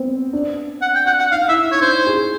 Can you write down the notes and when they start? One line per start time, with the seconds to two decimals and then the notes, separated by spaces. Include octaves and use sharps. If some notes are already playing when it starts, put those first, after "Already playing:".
Already playing: B3 C4
0.33 D4
0.82 F#5
0.95 G5
1.07 F#5
1.19 F#5
1.31 D#4 F5
1.48 E4 E5
1.64 D#4
1.72 C#5
1.81 D4 C5
2.06 G#4